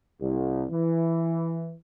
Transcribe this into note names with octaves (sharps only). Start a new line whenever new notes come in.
C2
E3